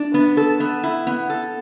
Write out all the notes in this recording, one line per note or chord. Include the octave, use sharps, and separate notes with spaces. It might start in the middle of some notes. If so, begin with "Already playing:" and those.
Already playing: D4
B3
A4
B3
E4
B3
A4